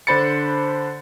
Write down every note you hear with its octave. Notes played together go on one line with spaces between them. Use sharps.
D3 D4 C5 B5 A6 C#7